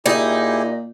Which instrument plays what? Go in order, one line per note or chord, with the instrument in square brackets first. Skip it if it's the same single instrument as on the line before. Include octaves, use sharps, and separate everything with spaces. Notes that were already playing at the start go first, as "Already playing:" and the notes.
[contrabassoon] A#2 [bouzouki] D#4 [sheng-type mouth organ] E4 G4 G#4